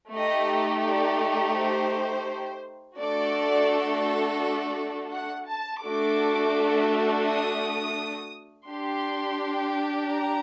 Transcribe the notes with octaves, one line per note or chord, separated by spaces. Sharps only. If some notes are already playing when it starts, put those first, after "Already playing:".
A3 D#4 G4 D#5
D5
C5
A3 D4 F#4 A4 D5
D5
F#5
A5
A3 D4 F#4 A4 D6
D#6
D4 G4 C6
A#5